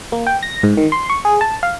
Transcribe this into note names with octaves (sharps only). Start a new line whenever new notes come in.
A#3
G5
A#6
G#2
D#3
C6
C#6
G#4
A5
F5